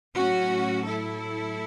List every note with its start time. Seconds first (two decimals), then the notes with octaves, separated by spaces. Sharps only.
0.15 A2 F#3 C#4 F#4
0.85 E4 A4